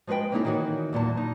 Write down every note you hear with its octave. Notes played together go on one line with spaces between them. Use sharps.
F3 G#3 F#4 B4 G5
A#3 C4 C#4 D#4 E4 A4
D#3 E3 D#4 F#4 C#5
E2 A#2 F#3 A5
D#4